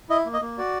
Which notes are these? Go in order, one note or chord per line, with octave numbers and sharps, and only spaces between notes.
E4 D#5
A#3
D#5
A#3
F#4 D5